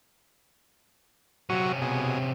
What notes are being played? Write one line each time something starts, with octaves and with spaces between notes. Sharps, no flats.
C3 F#3 C#4 F#4
B2 G#4